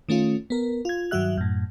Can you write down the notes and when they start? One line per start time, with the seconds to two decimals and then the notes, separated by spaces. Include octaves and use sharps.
0.09 D#3 A3 C#4 F4
0.50 B3 A#4
0.85 F4 G#6
1.11 G2 D#3 F#3 F#4 E5 F#6
1.38 F#2 A2